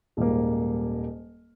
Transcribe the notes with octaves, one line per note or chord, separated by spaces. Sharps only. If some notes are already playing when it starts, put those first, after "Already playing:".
D#1 G#2 G3 A#3